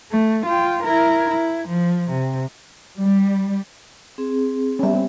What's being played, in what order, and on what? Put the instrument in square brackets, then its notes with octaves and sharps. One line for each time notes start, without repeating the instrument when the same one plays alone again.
[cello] A3
F4 G5
E4 A#4
E4
F3
C3
[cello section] G3
[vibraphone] C4 G#4
[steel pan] G3 C#4 [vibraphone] B3 E5
[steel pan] G3 C4